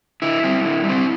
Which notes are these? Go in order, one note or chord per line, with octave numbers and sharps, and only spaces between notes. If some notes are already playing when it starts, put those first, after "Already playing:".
D3 E4
G3 C4
D3
G3
C4